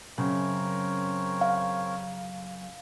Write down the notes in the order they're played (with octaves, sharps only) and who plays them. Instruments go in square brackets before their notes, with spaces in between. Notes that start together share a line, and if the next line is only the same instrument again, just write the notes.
[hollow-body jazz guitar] F#2 [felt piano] C#3 [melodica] C4 A#4 C#5
[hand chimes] F5